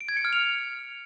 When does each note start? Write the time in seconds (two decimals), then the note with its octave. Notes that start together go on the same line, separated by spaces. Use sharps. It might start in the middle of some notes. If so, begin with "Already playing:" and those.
0.01 D7
0.09 G#6
0.17 C#7
0.25 F6
0.33 F7